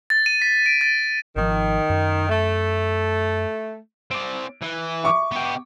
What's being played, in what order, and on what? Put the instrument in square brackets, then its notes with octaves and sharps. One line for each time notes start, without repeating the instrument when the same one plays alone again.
[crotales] A6
D#7
B6
D7
A6
[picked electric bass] G#1 B2 F3 [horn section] D#3
[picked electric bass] F#2
[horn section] A3
[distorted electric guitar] C4 D5 [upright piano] D7
[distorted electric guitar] E3
[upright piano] E5 C#6 D6
[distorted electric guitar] B3 G4